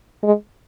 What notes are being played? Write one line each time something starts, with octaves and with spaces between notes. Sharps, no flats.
G#3